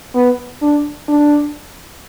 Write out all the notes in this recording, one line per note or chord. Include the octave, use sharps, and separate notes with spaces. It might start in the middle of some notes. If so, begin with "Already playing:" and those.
B3
D4
D4